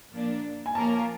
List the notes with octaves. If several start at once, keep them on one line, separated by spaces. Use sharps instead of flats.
A#2 F3 A#3 D4
G#5
F3 A#3 C#4 F4 A#4 A5